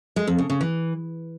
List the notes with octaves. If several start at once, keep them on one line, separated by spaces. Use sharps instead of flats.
G#3
F2
C#3
C#3
E3